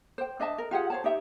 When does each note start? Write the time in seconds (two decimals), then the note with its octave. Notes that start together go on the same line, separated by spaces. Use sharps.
0.18 C5 G5
0.40 D4 D#5 E5 A5
0.58 A#4
0.71 F4 G4 G#4 F#5
0.90 C5 C#5 A5
1.04 D#4 G4 E5